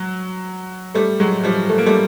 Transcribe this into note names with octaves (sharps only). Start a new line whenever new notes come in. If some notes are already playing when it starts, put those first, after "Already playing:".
Already playing: F#3
G3 A3
F#3 G#3
F3 G3
A3
A#3
G3 A3